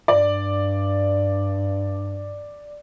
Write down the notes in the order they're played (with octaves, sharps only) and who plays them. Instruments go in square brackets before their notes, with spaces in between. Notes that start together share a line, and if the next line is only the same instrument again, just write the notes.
[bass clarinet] G2 [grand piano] D5